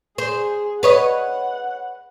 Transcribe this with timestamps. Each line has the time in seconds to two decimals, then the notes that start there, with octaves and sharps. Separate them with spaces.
0.18 G#4 C5
0.83 B4 C#5 D#5 F#5